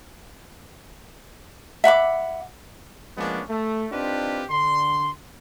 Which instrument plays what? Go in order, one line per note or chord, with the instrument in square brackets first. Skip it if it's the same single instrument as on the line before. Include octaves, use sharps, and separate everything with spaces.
[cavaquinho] E5 F#5 B5 D6
[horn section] F3 G#3 A#3 B3 C#4 D4
A3
C4 D4 D#4 F4 G4 B4
D3 C6